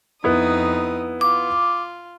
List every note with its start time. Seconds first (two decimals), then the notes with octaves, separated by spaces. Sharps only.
0.24 F2 B3 D#4 E4 D#6
1.21 F4 D6